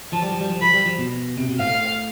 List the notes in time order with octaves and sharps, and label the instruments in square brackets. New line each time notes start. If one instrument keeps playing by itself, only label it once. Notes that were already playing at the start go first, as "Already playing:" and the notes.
[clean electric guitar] F3 [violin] A5
[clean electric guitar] G3
F3
G3
F3
[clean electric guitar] F3 [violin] B5
[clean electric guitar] G3
F3
B2
C3
B2
[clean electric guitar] A2 [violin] F5